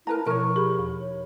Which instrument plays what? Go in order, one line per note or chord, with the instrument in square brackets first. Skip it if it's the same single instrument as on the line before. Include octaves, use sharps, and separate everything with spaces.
[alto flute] E4 [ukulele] A#4 B4 A#5 [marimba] A5
[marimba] B2 F3 E4 [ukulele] A#4 C#5 [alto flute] C#6
[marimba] G4 G#4 B5
E2
[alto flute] C#5